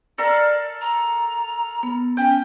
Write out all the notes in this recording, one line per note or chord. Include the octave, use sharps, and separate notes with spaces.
A4 A#4 D5 F5
A#5
B3
C#4 G5